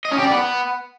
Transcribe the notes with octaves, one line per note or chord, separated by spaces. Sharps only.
D#5
C#4
G4
D5
B3